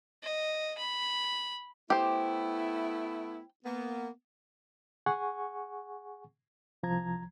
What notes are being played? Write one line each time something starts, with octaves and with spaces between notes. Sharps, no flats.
D#5
B5
A3 B3 E4 G4 C5
A#3 B3
G#4 F#5 G#5 C#6
C2 F3 A#5 G#6